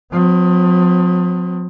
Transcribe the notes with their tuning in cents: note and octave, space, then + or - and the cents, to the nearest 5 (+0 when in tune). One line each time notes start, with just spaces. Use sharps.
F3 +40 C4 -30